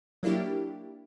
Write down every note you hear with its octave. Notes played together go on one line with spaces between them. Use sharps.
F#3 A#3 D4 E4 G4